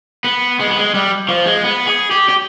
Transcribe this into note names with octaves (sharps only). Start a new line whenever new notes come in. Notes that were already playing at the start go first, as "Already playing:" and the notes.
B3
G#3
B3
G#3
G3
F3
G#3
B3
G#4
G4
G4